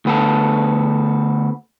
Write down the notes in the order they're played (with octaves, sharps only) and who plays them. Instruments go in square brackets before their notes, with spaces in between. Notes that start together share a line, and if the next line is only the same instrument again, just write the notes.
[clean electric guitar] D2 B3 A4